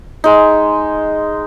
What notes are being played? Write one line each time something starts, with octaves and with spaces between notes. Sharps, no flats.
G#3 D#4